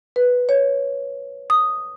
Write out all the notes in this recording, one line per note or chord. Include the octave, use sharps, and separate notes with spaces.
B4
C#5
D#6